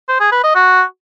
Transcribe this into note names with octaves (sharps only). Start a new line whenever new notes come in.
C5
G#4
B4
D#5
F#4